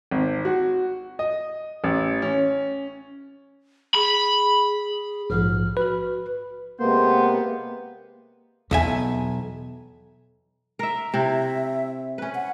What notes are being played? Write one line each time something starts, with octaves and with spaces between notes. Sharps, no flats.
G#1
F#4
D#5
A1
C#4
G#4 B5
A#1 G#2 F3 F6
F#4 B4
C3 G#3 A#3 B3 C5
B1 E2 E5 G#5
A#4 E5
C3 E4 E5
C#4 B4
F#5